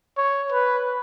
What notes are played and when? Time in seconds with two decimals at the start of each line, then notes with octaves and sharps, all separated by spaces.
0.18 C#5
0.52 B4